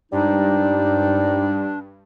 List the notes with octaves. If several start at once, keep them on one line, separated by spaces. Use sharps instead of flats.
G2 F3 G3 G#3 D4 D#4